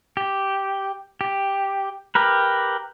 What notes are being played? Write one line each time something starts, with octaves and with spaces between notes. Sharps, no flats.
G4
G4
G4 A#4 B4